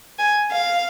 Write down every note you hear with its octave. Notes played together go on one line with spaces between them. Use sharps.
G#5
F5